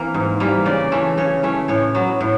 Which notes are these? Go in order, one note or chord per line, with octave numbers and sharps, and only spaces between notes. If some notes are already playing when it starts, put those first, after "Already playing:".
Already playing: E3 A#3 C4
G#2
E3 G3 A#3
C#3 D5
E3 A3 C#4
C#3 C#5
E3 A3 C#4
A2 C#5
F#3 B3
A2